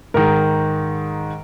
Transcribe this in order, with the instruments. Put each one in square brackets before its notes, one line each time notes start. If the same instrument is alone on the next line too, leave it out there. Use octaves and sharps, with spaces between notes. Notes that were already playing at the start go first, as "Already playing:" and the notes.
[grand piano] G#2 D#3 A#4